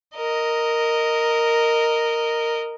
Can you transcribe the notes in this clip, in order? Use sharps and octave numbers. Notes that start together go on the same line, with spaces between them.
A#4 D#5